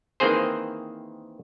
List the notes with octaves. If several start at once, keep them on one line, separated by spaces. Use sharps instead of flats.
D#3 E3 A#3 C4 G#4 C5